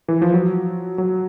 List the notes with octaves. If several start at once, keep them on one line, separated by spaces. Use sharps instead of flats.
E3
F3
F#3
F#3